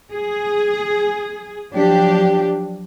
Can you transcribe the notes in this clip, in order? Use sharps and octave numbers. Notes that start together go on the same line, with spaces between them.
G#4
F3 F#3 D4 G4